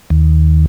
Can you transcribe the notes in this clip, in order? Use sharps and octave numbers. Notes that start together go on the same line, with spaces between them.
D#2